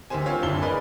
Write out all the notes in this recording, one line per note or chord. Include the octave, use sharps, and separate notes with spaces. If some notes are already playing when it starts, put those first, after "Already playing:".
D2 D#3 C4 G4 C5 G#5
C4 F4 C#5
F#1 D2 D4 E4 A5 G7
G#4 A#4 B4 D5 D#5